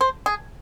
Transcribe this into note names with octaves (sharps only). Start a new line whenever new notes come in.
C5
G#4